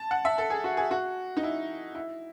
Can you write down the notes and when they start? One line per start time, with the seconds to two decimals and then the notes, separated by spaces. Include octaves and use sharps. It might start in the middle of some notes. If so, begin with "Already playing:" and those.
Already playing: A5
0.11 F#5
0.25 E5
0.38 A4
0.50 G#4
0.64 F#4
0.77 G#4
0.91 F#4
1.37 D#4
1.43 E4
1.95 E4